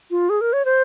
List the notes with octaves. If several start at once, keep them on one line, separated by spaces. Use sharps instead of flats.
F4
G#4
A#4
C#5
C5